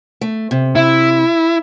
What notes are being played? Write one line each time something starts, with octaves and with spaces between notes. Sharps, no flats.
A3
C3
E4